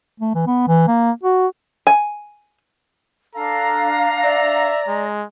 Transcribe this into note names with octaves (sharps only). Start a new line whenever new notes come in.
A3
E3
B3
E3
A#3
F#4
G#5
D4 A4 F5 A#5
D5 E5
G#3